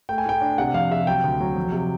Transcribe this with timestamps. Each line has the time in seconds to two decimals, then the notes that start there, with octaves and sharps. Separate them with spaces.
0.09 A3 G5
0.18 G#5
0.25 A2 G5
0.41 D4
0.58 C3 F#5
0.74 F2 F5
0.91 C3 E5
1.07 F#3 G5
1.24 D2
1.40 F#3
1.56 F2
1.72 C3